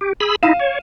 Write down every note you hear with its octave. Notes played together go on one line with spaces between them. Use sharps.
G4
G#4 B5 E6
D#4 E4 F5 D#7 E7
C#5